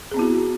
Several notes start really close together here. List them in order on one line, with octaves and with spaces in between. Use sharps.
G#4 C4 B3 E4 F#4